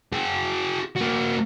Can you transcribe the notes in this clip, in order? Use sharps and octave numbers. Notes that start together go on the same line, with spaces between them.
F#4 G#4
A#3 F#4